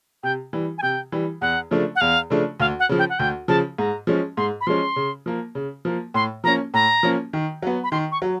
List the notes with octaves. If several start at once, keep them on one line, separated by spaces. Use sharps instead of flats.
C3 G5
E3 G3
G#5
C3 G5
E3 G3
E2 F#5
C#3 F3 A3 D4
F#5
E2 F5
C#3 F3 A3 D4
D2 F5
F#5
C#3 F3
G5
F#5
D2 G5
C#3 F3 A5
G#2 A#5
F3 G#3 C#4
G#2 C6
B5
F3 G#3 C#4 C6
C#3
F3 A#3
C#3
F3 A#3
A2 C6
F3 A#3 C#4 A#5
A2 A#5
F3 A#3 C#4
D#3
F#3 B3
B5
D#3 C6
C#6
F#3